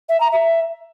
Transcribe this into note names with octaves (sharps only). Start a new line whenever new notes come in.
E5
A#5
E5